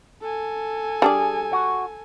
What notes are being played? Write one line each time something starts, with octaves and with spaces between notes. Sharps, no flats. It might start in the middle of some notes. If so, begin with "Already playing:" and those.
A4 G#5
G3 D4 G#4 D5
F#4